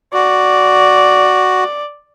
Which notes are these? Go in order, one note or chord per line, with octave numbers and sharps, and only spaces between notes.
F#4 D5